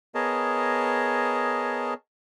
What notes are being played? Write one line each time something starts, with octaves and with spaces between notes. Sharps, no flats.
B3 G#4 A#4 C#5 D#5 A5